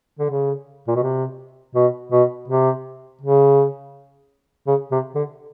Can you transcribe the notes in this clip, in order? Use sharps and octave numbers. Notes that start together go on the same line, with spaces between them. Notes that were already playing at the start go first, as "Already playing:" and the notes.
D3
C#3
A#2
B2
C3
B2
B2
C3
C#3
C#3
C3
D3